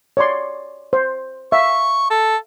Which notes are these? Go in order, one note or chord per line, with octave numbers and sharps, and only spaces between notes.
C#5 D5 C6
C5
E5 F5 C#6
A4